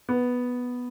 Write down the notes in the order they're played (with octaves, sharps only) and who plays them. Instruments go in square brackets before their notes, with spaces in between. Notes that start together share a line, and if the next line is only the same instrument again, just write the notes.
[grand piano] B3